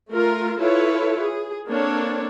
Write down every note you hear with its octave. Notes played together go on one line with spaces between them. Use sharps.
A3 F4 A#4
E4 F4 A4 B4 C#5
G#4
A#3 C4 D4 A4 C#5